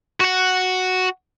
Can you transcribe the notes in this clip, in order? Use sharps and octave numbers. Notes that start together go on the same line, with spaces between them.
F#4 F#5